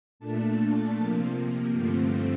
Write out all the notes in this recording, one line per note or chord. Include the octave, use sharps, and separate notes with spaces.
A#2 A3 D4 A5
C3 F3 A#3
G2 D3 F3 A3 C4